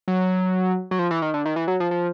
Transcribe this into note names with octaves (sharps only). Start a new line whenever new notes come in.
F#3
F#3
F3
E3
D#3
D3
D#3
E3
F#3
F3
F3